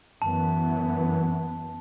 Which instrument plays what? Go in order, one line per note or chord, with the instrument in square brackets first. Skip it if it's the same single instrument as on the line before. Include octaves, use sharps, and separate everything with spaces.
[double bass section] F#2 E3 B3 [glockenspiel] A5